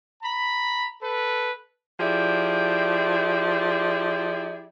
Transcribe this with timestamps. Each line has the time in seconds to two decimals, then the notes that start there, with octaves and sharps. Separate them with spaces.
0.23 A#5 B5
1.02 A4 B4
2.00 F3 E4 G4 G#4 D5